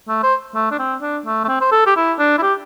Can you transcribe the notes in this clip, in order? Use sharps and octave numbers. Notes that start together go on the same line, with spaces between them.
A3
C5
A3
D4
C4
D4
A3
A3
C4
C5
A4
G4
E4
D4
E4
G4